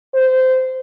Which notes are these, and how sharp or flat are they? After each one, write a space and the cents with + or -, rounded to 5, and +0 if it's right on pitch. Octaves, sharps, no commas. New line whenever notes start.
C5 -20